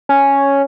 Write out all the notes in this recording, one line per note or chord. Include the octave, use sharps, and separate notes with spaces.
C#4